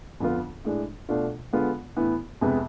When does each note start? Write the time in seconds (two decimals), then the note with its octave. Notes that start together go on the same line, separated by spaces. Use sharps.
0.20 F2 D3 F3 B3 F4
0.65 A2 G#3 D4
1.09 B2 A3 D4 F4
1.53 D3 G#3 B3 F4
1.97 A2 E3 B3
2.41 F2 C3 G#3 B3